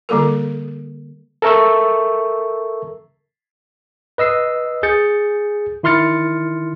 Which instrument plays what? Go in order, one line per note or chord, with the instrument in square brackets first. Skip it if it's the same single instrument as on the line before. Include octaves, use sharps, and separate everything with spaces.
[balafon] D3 G3 A#3 A4 A#4
[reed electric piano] A4 A#4 E5 C#6 E6
[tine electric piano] B4 D#5 E6 C7
G#4 G6 A6 C#7
D#3 E4 C6 F6 A6 C#7